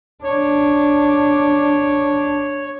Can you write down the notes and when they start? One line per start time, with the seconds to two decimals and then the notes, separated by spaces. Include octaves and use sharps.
0.24 D4 C#5